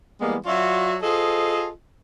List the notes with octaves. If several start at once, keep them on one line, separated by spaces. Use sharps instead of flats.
E3 G3 G#3 A#3 B3
F#3 F4 F#4 D5 E5
F4 G#4 A4 C5 D#5